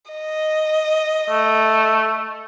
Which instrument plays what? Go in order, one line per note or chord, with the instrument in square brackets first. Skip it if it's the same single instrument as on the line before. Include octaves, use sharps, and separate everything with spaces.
[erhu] D#5
[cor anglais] A3